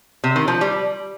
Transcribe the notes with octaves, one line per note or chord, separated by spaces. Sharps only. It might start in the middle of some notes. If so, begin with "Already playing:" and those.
C3
D#3
F3
G3